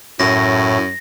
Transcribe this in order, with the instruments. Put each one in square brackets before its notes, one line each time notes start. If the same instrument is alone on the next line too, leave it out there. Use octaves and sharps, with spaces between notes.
[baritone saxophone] F#2 [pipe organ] A2 [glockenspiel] A#6